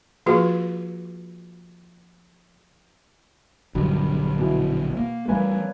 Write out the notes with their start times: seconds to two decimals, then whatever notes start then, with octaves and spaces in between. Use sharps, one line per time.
0.26 F3 A#3 F4 F#4 G#4 B4
3.75 A#1 G2 D3 F#3
4.39 B2 E3
4.97 A#3
5.28 E3 G3 A3 A#3 B4 G#5